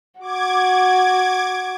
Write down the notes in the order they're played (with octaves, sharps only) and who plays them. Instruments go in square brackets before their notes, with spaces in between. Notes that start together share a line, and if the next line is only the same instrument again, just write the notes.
[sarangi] F#4 [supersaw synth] D6 G#6